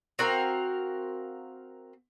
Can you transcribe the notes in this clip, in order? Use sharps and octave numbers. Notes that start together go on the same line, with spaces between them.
C4 F#4 A#4 F5